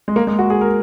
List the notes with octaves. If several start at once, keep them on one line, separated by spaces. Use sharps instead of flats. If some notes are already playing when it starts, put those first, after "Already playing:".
G#3
A#3
G#3
F#4
G#4
A#4